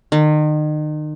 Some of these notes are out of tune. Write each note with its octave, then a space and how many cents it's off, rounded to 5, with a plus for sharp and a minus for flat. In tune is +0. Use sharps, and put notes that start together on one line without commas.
D#3 -35